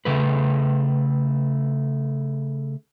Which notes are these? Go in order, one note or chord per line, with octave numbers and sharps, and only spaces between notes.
C#3 A3 B4